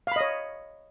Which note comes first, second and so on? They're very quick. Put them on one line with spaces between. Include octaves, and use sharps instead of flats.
F5 B5 D#5 C#5